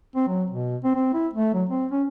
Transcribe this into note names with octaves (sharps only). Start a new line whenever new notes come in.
C4
F#3
B2
C4
C4
E4
A3
F#3
C4
C#4